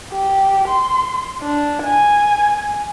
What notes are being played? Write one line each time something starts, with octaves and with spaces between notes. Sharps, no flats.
G4
C6
D4
G#5